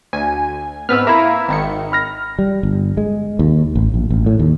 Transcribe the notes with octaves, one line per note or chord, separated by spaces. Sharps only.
D2 G#5
G#2 B3 C4 B4 E6 F6
A#3 E4 E5 A#5
G#1 D#3 C#7
B5 F6 A#6
G3
G1
G#3
D#2
A1
A#1
A1
A2
D#2